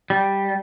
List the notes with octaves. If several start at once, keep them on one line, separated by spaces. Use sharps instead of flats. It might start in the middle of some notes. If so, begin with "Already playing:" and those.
G3